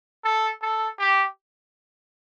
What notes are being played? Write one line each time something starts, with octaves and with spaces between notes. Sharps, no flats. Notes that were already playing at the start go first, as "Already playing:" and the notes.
A4
A4
G4